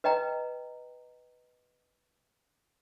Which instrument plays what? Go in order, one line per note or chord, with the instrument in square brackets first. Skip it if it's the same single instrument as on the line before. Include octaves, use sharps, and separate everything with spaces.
[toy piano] B4 D#5 G5 A#5